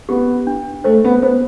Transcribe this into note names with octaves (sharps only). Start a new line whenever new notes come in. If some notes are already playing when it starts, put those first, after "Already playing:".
B3 G4
D4
A3 C5
B3
B3 C5